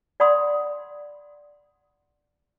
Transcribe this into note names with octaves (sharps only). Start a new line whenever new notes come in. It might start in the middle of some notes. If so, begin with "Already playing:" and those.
D5 F#5 G5 B5 C6 D#6